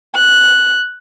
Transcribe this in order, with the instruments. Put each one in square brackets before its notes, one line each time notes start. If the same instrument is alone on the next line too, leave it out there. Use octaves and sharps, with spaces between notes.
[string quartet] F#6